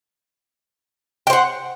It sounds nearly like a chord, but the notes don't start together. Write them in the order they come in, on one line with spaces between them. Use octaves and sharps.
G5 C5 F#5